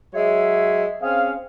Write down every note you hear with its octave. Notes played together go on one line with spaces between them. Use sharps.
F#3 G#3 C#5 E5
C4 C#4 G#4 F5